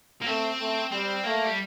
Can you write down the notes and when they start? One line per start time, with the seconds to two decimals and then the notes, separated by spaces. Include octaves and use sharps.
0.22 A#3
0.26 A3 C4
0.59 A3
0.92 G3 C4
1.24 A3 A#3
1.46 G3